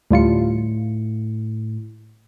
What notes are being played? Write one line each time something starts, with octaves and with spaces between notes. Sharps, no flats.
D2 A2 G3 F4 C#7